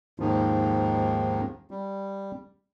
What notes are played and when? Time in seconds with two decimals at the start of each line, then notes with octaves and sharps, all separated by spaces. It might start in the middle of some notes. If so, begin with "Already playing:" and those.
0.20 D#2 G#2 D#3 F3
1.71 G3